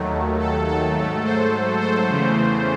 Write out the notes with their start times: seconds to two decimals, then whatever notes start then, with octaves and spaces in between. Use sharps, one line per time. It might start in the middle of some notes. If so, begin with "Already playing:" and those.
Already playing: D#2 D#3 F#3 A3
0.39 A4
0.68 A4
0.96 G#2 F#3 A3
1.25 C5
1.81 C5
2.08 E2 C#3 E3 A3